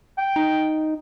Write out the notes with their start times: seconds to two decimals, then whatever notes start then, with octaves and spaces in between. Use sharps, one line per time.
0.18 G5
0.36 D#4